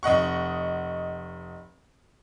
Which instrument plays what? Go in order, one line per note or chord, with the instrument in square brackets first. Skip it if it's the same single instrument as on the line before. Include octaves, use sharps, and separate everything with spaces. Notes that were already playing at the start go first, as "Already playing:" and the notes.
[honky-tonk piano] F1 D#5 F#5 C#6